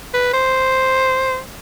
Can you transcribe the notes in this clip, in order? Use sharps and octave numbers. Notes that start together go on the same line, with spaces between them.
B4
C5